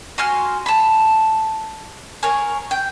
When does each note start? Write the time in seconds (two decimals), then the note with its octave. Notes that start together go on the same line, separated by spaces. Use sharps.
0.18 F#4 G#5 C6 F6
0.66 A5 B5
2.23 G#4 A#4 C#5
2.71 G5